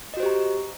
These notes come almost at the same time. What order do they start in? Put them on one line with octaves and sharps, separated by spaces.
D#5 F#4 C5 G4 A#5